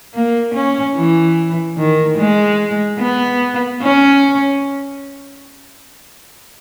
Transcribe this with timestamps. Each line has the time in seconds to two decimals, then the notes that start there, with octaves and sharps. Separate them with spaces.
0.14 A#3
0.55 C#4
0.96 E3
1.78 D#3
2.18 G#3
3.00 B3
3.82 C#4